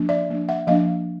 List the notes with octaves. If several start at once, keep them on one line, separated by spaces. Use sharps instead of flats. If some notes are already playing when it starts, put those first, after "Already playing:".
Already playing: F3 A#3 D4
D5 E5
F3 A#3 D4
E5 F#5
F3 A#3 D4 D#5 F5